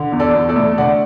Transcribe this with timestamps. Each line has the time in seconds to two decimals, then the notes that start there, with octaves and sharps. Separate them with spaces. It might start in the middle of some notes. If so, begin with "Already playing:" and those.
Already playing: D3
0.12 E2
0.20 A4 D5
0.35 E2
0.49 A4 D5
0.56 A3
0.78 D3 D5 F#5